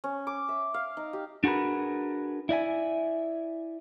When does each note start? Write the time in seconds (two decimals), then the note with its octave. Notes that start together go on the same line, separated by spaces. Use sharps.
0.04 C#4
0.27 D6
0.49 E5
0.74 F5
0.97 D#4
1.13 G4
1.44 D4 F#4 G#4 A#4 B4
2.49 E4 D5 E5 G#5